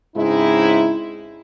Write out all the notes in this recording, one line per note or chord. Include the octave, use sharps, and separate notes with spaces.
G#2 C#3 G#3 C4 D#4 E4